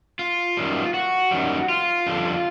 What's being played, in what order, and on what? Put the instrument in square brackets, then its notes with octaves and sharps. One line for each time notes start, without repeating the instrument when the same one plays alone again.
[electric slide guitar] F4
F#2 D#3 G3
F#4
F#2 D#3 G3
F4
F2 D3 G3